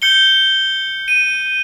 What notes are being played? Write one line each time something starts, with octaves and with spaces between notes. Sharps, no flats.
G6 C#7 G7
D#7